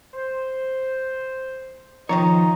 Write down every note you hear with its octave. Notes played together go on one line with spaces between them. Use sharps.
C5
G#2 D#3 F3 D#4 F4 C#5 D#5 A#5